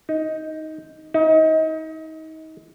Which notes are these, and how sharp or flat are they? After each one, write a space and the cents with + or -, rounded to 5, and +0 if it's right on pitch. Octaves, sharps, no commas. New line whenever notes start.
D#4 +10
D#4 +30